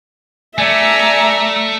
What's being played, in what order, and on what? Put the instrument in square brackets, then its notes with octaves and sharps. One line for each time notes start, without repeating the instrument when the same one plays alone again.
[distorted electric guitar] A3 [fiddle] D5 [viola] E5 A#5 [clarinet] G#5